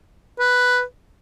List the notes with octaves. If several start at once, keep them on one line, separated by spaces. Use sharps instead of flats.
B4